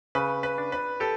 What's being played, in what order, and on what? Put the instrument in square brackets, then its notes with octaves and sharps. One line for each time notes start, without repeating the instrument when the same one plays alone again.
[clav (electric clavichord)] C#3 [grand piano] B4
[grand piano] B4
[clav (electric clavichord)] D4
[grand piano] B4
[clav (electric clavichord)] G4 [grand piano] A4